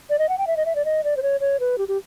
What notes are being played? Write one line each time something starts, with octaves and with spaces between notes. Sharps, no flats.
D5
D#5
F#5
G5
E5
D#5
E5
D5
D#5
D5
C5
C#5
C#5
B4
G4
G4